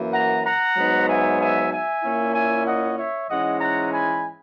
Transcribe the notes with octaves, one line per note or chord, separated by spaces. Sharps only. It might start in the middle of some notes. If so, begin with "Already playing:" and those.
Already playing: F#2 E3 A#3
F#5 A#5
F#5 A#5
G#2 F#3 B3 D#4
E5 G#5
E5 G#5
E5 G#5
A#2 A#3 C#4 E4
E5 G#5
D#5 F#5
C#5 E5
G#2 E3 G#3 C#4 E4 D#5 F#5
F#5 A#5
G#5 B5